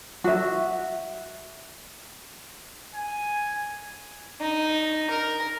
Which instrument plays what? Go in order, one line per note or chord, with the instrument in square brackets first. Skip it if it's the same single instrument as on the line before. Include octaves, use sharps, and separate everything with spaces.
[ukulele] F#4 E5
[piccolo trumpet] G#5
[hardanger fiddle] D#4
A#4